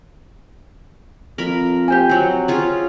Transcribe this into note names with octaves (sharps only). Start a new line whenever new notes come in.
F2 A#4 B5
G4 C5 G#5
F#3 C4
C#4 F4 G#4